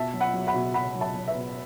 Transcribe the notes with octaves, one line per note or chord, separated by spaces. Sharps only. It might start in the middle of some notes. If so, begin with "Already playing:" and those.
Already playing: B2 E5 A5
F#3
F#5 B5
F#3
F#5 B5
B2
B2 F#5 B5
F#3
E5 A5
F#3
B4 E5
B2